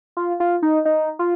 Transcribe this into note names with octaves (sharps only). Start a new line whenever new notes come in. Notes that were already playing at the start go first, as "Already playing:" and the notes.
F4
F4
D#4
D#4
F4